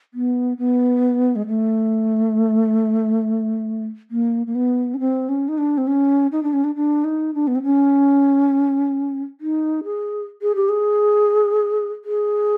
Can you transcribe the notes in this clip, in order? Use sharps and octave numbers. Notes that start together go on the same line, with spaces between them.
B3
B3
G#3
A3
A#3
A#3
B3
C#4
C4
C#4
D#4
D4
C4
C#4
D#4
D4
C#4
D4
D4
D#4
D4
B3
C4
C#4
D#4
G#4
G#4
G4
G#4
G#4